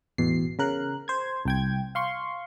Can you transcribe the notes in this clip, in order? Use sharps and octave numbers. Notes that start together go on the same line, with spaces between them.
A1 E2 B2 C7
C#3 A#4 F#6
C5 G#6
C2 G5 G#6
F5 C6 C#6